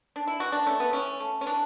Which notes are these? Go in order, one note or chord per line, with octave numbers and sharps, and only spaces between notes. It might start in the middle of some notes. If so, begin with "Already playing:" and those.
D4
E4
E3 F#4
D4
A3 C#4
B3
E3 C#4
A3
C#4
E3 D4